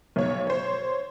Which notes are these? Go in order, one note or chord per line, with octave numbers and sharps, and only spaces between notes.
B1 C#5
C5 C#5